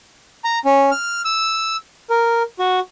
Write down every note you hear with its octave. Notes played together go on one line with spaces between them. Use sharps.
A#5
C#4
F6
E6
A#4
F#4